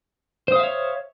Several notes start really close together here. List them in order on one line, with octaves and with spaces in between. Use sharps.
C5 D#6 F5 E5 C#5